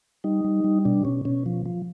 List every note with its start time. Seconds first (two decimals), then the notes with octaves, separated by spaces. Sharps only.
0.24 G3 D#4
0.45 G3
0.64 G3
0.85 B2 D4
1.05 B2 C#4
1.25 B2 C#4
1.46 F3
1.66 F3